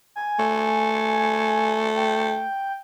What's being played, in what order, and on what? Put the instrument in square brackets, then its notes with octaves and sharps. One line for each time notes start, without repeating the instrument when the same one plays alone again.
[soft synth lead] G#5
[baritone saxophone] A3
[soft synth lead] G5